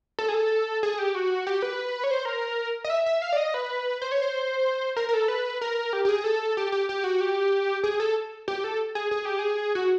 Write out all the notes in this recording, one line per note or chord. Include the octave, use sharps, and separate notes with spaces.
A4
G#4
A4
G#4
G4
F#4
G4
B4
C#5
C5
A#4
D#5
E5
E5
F5
D5
D#5
B4
C5
C#5
C5
A#4
A#4
A4
B4
A#4
G4
G4
G#4
A4
G4
G4
G4
F#4
G4
G#4
A4
G4
A4
G#4
G#4
G4
G#4
F#4